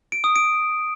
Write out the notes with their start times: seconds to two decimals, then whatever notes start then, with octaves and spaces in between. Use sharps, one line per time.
0.12 D7
0.24 D#6
0.36 D7